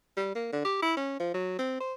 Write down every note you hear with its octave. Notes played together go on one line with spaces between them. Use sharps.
G3
A#3
D3
G4
E4
C#4
F3
F#3
C4
C5